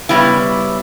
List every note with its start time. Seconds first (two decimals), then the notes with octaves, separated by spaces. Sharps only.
0.09 C#3 G3 B3 E4